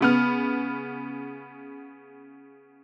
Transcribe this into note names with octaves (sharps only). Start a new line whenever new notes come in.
C#3 B3 F6